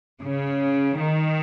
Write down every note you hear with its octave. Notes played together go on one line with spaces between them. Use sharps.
C#3
D#3